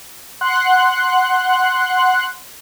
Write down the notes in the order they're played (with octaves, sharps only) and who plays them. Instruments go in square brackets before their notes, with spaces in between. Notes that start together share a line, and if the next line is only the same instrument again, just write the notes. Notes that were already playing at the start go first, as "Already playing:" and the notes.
[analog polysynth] F#5 C6 F#6